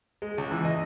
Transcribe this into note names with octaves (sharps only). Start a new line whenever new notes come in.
G#3
C#2
E3
D#5